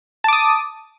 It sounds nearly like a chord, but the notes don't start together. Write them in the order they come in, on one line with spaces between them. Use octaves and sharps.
A5 D6 D#6